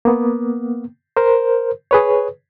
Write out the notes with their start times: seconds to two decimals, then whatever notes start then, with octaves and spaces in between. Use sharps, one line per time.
0.05 A#3 B3
1.17 A#4 C5
1.91 G#4 B4 C#5